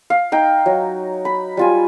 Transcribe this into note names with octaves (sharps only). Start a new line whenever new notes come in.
F5
D#4 G5
F#3
B5
G3 F4 G#5